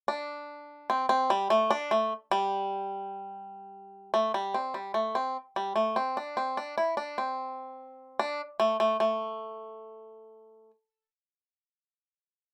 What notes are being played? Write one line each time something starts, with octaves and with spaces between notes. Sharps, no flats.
D4
C4
C4
G3
A3
D4
A3
G3
A3
G3
C4
G3
A3
C4
G3
A3
C4
D4
C4
D4
E4
D4
C4
D4
A3
A3
A3